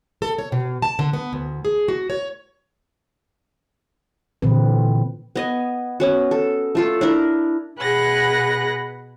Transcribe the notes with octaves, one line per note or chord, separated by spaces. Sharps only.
A4
C#5
B2
A5
D3
B3
D2
G#4
F#4
C#5
A#2 D3 E3 C4 B4
B3 D#5 G#5
B3 C#4 F#4
A4
A3 F4 A4
D4 E4 A#4
B2 G#4 B4 F#5 F#6 A#6